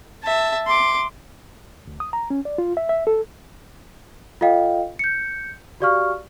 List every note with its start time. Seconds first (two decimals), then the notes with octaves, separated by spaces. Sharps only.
0.23 E5 A5
0.67 C6 D6
1.88 D2
2.00 D#6
2.13 A#5
2.30 C#4
2.45 D5
2.58 F4
2.77 E5
2.89 E5
3.07 A4
4.41 F4 A4 D#5 F5 G5
4.99 G6 C#7
5.80 F#4 G4 D5 F5 C#6 F6